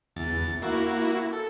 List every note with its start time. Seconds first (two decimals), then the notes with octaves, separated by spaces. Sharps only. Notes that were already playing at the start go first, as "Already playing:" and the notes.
0.16 E2 A6
0.62 A#3 E4 F#4
1.33 A4